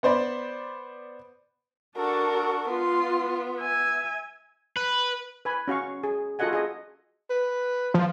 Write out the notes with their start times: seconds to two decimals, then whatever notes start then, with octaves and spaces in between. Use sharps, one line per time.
0.03 B3 C5 D5 B5
1.96 D4 F#4 A4 A#4
2.69 B3 F4 C6
3.58 E5 G#5
4.76 B4
5.45 B4 G#5 B5
5.68 C#4 F#4 F5 C#6
6.03 G#4
6.39 F4 F#4 A4 D#5 F#5 G#5
6.53 G#4 D#5
7.30 B4
7.94 F3